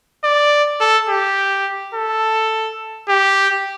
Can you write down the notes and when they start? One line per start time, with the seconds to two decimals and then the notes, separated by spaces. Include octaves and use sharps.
0.24 D5
0.81 A4
1.09 G4
1.94 A4
3.09 G4